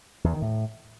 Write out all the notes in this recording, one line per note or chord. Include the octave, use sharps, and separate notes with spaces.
E2
D#3
A2